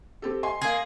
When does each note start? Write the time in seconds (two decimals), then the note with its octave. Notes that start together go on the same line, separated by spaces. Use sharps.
0.22 C4 G4 A4
0.43 D#5 G#5 C6
0.62 A#3 G#4